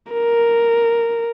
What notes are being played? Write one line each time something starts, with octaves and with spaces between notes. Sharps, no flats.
A#4